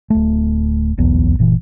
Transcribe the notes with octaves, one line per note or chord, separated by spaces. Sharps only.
D1 A3
D1 B1 E2 B3
F#1 A#2 E3